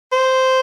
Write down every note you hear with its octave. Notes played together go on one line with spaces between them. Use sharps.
C5